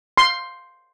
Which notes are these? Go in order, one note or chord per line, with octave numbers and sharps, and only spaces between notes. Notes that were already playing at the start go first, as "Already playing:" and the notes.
C6